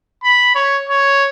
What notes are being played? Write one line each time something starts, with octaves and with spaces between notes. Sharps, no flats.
B5
C#5
C#5